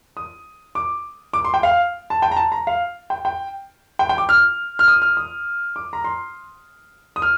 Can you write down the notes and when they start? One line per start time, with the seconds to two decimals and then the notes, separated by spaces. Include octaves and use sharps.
0.17 D#6
0.75 D6
1.33 D6
1.44 C6
1.54 G5
1.63 F5
2.10 A5
2.22 G5
2.31 A#5
2.37 A5
2.52 A#5
2.67 F5
3.10 G5
3.25 G5
3.99 G5
4.09 G5
4.18 D6
4.29 F6
4.79 F6
4.88 D#6
5.02 F6
5.17 D#6
5.76 D6
5.93 A#5
6.04 C6
7.16 D#6
7.22 F6